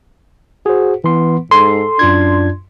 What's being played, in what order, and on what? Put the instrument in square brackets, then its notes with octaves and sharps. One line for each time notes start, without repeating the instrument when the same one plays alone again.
[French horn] F#4 [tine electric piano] G#4 C5
[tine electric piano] E3 C6 [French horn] B3
[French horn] G#2 [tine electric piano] A4 [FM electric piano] C6
[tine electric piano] F#2 F4 G#6 [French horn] D4